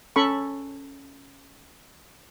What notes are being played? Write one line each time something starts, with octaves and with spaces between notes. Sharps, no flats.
C#4 A4 B5 C#6